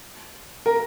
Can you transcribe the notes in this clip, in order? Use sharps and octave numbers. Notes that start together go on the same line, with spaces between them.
A#4